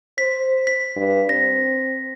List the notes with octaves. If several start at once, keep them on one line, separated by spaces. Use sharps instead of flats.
C5 B6
B6
G2
C4 A#6